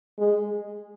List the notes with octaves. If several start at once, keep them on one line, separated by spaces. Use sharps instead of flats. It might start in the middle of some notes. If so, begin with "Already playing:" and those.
G#3